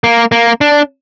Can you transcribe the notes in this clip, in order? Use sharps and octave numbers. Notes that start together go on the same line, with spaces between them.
A#3
A#3
D4